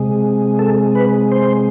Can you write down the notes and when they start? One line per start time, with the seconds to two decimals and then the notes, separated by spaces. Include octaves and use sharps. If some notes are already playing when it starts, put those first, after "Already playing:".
Already playing: C3 G#3
0.59 A4
0.95 B4
1.32 C5